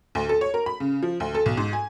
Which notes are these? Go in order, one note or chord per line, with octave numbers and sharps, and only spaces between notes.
D2
A4
C#5
A#4
B5
C#3
F3
D2
A4
B1
G#2
G#5